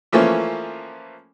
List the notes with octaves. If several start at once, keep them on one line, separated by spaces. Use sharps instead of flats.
E3 F3 A3 A#3 C#4